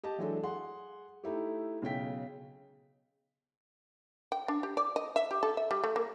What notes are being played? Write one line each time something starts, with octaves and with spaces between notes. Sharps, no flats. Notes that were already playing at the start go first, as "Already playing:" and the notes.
G4 D#5 A5
E3 F#3 G#3 D4 A4
G#4 F#5 C6
A3 D#4 E4 G4
B1 C#3 G5 B6
G5
D4
G4
D5
D#5
E5
G4
A4
E5
G3
A3
A#3